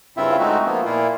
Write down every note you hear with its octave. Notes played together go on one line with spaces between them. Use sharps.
G2 C#3 C4 E4 F4 E5
G#3 A3 C4 D#4 F#4
F3 A#3 B3
A#2 A#3 E4 F4